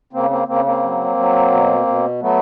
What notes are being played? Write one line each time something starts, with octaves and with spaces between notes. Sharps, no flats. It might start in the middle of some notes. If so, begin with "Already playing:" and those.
C#3 A#3 C4
A#3 C4
C#3 A#3 C4
A#3 C4
F#3
F#3
B2
B2
F#3 A3 B3